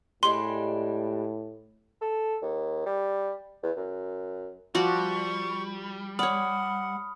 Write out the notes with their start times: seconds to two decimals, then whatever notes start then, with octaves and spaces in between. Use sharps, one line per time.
0.23 A2 G3 G#3 D4 C6
2.02 A4
2.42 D#2
2.86 G3
3.63 E2
3.77 F#2
4.75 F3 G3 F#4 D5 C#6
6.19 C#5 D5 F#5 B5 D#6 F6